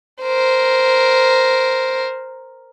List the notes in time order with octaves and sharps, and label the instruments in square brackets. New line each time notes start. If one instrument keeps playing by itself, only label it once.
[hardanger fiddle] A#4 C5